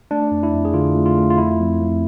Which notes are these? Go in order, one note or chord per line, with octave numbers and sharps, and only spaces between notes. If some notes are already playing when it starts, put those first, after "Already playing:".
A3 D4
F2
E4
F2
G#4
D3 F4
A3
F4
A3
F4
F2 E4
F2
F2